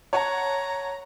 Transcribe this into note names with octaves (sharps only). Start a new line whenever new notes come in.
C#5 F#5 A5 A#5